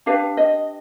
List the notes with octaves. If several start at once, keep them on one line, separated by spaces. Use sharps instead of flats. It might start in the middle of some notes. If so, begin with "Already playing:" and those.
D4 G4 B4 F5
D#5